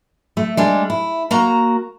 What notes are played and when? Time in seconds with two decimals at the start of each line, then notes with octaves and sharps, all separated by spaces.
0.37 A3
0.57 G3 G#3 D4
0.90 E4
1.31 A#3 F#4 A#5